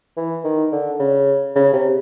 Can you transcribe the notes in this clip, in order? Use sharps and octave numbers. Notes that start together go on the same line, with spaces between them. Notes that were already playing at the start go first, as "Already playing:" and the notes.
E3
D#3
D3
C#3
C#3
C3